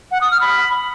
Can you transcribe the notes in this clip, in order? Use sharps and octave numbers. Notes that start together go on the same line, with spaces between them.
F#5
D#6
F6
B5